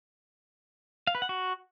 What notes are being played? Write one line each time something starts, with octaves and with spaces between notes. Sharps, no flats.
F5
B4
F#5
F#4